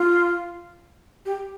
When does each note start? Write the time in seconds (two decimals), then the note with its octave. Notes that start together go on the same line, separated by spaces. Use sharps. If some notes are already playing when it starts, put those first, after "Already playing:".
Already playing: F4
1.26 G4